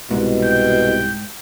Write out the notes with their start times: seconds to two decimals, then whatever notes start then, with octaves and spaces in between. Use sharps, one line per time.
0.11 C2 G#2 B2
0.44 G5